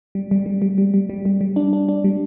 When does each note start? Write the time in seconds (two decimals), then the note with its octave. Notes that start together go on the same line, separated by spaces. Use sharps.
0.15 G3
0.31 G3
0.46 G3
0.62 G3
0.78 G3
0.94 G3
1.09 G3
1.25 G3
1.41 G3
1.56 D4
1.73 D4
1.88 D4
2.04 G3